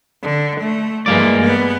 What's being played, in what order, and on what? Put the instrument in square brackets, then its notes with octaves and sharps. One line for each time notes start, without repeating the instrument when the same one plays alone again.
[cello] D3
A3
[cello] G2 E3 [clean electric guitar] G#3 A#3 D5
[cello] B3